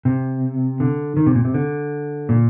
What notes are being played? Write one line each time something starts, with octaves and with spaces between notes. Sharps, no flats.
C3
D3
D#3
C3
A#2
C3
D3
A#2